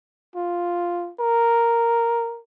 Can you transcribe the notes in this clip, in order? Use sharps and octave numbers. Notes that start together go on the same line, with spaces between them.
F4
A#4